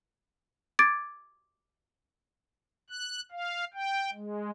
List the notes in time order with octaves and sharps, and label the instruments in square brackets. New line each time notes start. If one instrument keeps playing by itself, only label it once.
[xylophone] D6 G#6 A6 D7
[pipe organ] F#6
F5
G5
G#3